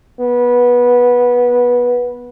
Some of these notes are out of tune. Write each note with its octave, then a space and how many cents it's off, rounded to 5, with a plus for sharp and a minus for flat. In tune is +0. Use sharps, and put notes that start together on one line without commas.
B3 -15